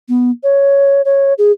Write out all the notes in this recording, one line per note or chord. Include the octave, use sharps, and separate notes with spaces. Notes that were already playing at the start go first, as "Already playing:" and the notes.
B3
C#5
C#5
G#4